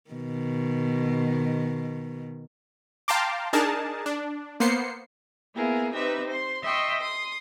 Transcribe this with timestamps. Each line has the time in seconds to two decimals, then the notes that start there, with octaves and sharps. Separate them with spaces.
0.10 B2 D#3
3.08 F5 G5 A5 A#5 C6 D6
3.53 D4 D#4 G#4 A#4 A5
4.06 D4
4.60 A#3 B3 C5 C7 C#7
5.54 A#3 B3 E4 G#4 A#4
5.93 C4 D#4 G4 B4 E5
6.27 C5 C6
6.63 D#5 E5 G5 C6 C#6
7.00 C6 D#6